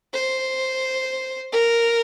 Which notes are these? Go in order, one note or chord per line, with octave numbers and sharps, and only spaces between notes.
C5
A#4